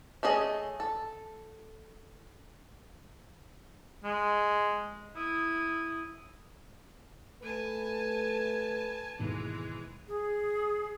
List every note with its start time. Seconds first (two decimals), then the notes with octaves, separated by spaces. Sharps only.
0.23 A3 C#4 G#4 D#5
0.80 A4
4.04 G#3
5.15 E4 D#6
7.42 A3 B4 G#5 A5
9.19 D#2 G#2 B2 E3 G#3
10.08 G#4